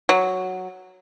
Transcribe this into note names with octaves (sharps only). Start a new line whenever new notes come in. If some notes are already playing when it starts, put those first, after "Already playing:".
F#3